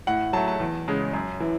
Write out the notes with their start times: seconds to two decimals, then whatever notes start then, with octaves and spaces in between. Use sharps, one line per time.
0.07 A2 F#5
0.33 F#3 A3 A5
0.48 A5
0.60 E2
0.88 C#3 G#3
1.13 F#2
1.40 E3